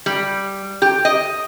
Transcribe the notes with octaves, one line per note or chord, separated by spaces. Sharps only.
G3
G4
D#5